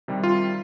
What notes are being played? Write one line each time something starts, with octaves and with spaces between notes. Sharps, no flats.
C3 D#3 G3
F4